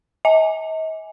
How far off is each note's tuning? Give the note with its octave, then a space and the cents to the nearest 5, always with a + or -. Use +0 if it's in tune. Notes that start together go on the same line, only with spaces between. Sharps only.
D#5 +45 G#5 +0